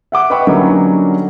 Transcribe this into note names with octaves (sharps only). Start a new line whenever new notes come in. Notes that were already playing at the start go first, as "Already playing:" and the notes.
E5 F#5 D6
B4 D#5 E5 G5 B5 C#6
D3 F#3 G3 A#3 C#4 D#4